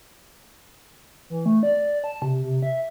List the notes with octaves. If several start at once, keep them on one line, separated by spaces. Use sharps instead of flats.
E3
A3
D5
A5
C3
C3
E5